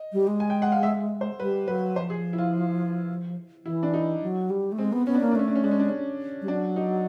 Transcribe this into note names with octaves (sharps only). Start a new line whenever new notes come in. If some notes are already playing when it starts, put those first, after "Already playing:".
Already playing: D#5
G3
G#3
G#5
G5
F#5
F5
E5
C5
G3 B4
F#3 B4
F3 C5
G#4
E4
F4
E3 E4
D4
D#4
F#3
G3
A3
G#3 C4
B3
B3 C#4
D4
A#3 C#4
D4
A3 C#4
D4
C#4
G#3 D4
C#4
D4
C#4
G3
F#3 D4
D#4